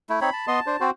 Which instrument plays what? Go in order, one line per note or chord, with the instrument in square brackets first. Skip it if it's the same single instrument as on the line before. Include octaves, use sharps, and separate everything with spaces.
[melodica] A3 E4
[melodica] C4 D#4 C#5 [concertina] B5
[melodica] A5
[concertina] B3 D#5 C6
D4 C5
C4 F#4 C5